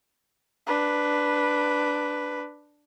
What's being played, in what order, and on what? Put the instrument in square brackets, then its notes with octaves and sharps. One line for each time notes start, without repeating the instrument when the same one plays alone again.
[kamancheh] D4 B4